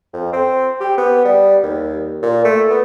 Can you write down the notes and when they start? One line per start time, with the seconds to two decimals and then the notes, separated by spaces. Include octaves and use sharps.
0.13 F2
0.33 C4
0.80 G4
0.98 B3
1.25 G3
1.63 D#2
2.23 A#2
2.44 A3
2.70 B3